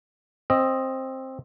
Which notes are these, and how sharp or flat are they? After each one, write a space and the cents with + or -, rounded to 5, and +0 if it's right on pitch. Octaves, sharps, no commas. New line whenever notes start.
C4 +10 D#5 +0